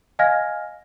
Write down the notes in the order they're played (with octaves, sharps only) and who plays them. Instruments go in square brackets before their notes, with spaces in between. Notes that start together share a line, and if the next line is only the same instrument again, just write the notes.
[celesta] D#5 F5 G#5 F6 G#6 A#6